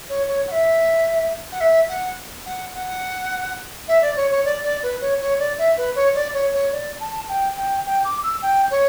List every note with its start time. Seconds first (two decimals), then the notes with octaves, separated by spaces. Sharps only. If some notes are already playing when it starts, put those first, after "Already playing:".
0.09 C#5
0.28 C#5
0.47 F#5
0.51 E5
1.52 F#5
1.60 E5
1.89 F#5
2.46 F#5
2.74 F#5
3.88 E5
4.01 D5
4.16 C#5
4.30 C#5
4.45 D5
4.63 D5
4.83 B4
5.01 C#5
5.20 C#5
5.39 D5
5.58 E5
5.77 B4
5.95 C#5
6.15 D5
6.33 C#5
6.53 C#5
6.72 D5
7.00 A5
7.28 G5
7.57 G5
7.85 G5
8.04 D6
8.23 E6
8.42 G5
8.70 C#5